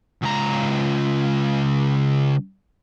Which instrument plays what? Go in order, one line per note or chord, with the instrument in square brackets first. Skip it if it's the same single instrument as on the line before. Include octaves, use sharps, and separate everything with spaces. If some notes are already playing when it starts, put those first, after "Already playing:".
[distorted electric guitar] C#2 A#5